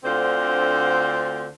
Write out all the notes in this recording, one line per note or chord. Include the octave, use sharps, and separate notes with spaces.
D2 D3 C4 F4 C5